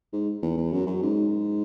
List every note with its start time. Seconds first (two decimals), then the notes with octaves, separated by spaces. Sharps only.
0.13 G#2
0.42 E2
0.57 E2
0.72 F#2
0.87 F#2
1.02 G#2